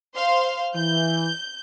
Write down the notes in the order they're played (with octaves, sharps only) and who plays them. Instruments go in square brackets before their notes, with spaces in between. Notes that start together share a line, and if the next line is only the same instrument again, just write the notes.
[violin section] C5 F5 C6
[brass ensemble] E3 [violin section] G6